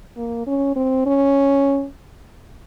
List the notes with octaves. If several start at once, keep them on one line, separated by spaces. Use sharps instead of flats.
A#3
C#4
C4
C#4